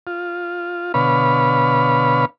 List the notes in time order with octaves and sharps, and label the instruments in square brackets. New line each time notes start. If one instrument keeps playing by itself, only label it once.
[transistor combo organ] F4
B2 D3 B4 C#5 F5 B5